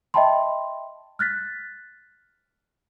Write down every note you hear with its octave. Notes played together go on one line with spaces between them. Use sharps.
D#5 E5 G5 A5 B5 C6
F6 F#6 A6 B6